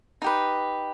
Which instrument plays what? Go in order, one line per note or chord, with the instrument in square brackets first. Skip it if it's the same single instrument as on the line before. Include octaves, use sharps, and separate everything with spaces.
[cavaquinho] D#4 G4 B4